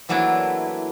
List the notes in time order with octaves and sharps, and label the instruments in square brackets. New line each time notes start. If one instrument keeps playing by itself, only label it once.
[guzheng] E3 F#3 A3 A#3 D4 E4